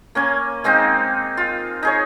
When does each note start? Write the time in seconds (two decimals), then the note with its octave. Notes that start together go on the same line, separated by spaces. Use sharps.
0.15 A#3 C#4 G#5
0.64 G#3 A#3 C4 D#4
1.37 F4
1.83 D#4 G#4 C#5